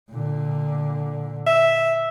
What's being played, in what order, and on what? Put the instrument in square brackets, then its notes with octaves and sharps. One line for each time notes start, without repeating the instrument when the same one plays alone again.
[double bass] A#2 D3
[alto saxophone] E5